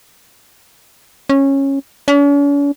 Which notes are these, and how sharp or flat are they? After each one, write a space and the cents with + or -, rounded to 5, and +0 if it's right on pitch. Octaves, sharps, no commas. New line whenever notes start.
C#4 -15
C#4 +45